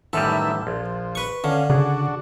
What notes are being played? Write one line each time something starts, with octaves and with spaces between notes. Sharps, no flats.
F#2 A2 D#3 E3 G3 A4 E5
A#1 F3
B4 C#6
D3 C#4 E5 F5
C#3 D4 F#4 G#4